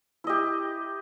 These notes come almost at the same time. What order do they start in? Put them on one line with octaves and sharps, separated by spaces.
E4 D#5 G4